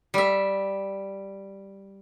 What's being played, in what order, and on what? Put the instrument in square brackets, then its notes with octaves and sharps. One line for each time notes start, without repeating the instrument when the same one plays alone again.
[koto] G3 E5